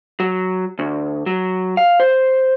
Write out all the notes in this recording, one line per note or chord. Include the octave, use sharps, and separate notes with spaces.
F#3
D2
F#3
F5
C5